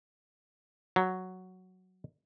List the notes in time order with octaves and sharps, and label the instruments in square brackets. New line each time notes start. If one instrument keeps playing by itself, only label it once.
[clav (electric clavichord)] F#3